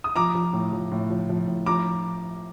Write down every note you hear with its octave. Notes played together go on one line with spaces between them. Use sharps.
D#6
F3 A#5 D6
F3
A2
F3
A2
F3
F3
A2
F3 A#5 D6